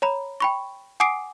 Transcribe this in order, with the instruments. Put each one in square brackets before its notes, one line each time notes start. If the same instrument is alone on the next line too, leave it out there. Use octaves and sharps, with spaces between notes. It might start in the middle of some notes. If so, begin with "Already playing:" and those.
[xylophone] C#5 A#5 B5
G5 B5 C#6
F#5 G#5 D6 D#6 C7 D7